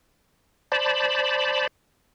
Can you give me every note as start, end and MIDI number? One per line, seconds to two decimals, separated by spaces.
0.72 1.67 72
0.72 1.67 74
0.72 1.67 81
0.72 1.67 83